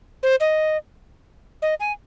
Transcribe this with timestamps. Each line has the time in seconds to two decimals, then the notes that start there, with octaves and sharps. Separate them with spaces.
0.23 C5
0.40 D#5
1.62 D#5
1.80 G#5